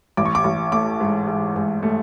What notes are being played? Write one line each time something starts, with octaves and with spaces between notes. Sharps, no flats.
A1 D6
C#6
D6
A1
A3 D6
G#2
G#2
G#2
A3